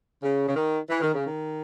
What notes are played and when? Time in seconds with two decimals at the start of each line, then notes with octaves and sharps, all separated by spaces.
0.22 C#3
0.48 C#3
0.55 D#3
0.89 E3
1.02 D#3
1.14 C#3
1.25 D#3